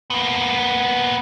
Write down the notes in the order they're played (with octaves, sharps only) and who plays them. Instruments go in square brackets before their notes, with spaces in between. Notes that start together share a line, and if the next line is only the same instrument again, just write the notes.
[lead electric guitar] A#3 B3